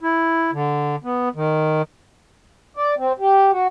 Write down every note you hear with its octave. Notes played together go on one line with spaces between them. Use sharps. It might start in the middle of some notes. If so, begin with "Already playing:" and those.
E4
D3
B3
D#3
D5
C4
G4
F#4